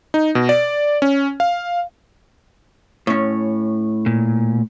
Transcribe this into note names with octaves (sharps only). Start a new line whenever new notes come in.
D#4
B2
D5
C#4
F5
A2 C#4
A#2